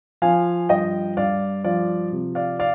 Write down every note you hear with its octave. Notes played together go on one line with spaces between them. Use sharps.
F3 F5 G#5
G2 D#5 G5
G2 D5 F5
F3 D5 F5
C3
D5 F5
D5 F5